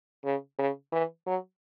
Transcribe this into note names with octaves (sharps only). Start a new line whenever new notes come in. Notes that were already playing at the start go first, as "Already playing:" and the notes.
C#3
C#3
E3
F#3